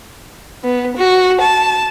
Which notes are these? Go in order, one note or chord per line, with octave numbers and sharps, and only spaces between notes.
B3
F#4
A5